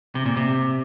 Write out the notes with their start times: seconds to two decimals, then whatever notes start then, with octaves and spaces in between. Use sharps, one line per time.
0.15 C3
0.26 A#2
0.37 C3